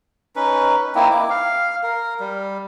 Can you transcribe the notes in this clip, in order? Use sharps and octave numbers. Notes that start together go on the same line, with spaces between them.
C#4 D#4 B4
A#3 C4 D#4 E4
D6
F5
A#4
G3